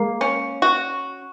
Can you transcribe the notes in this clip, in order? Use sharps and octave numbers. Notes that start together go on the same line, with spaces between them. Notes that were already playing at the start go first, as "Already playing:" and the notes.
Already playing: G#3 A#3
C#4
F#4